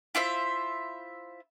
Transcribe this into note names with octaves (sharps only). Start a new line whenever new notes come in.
E4 F4 C5 E5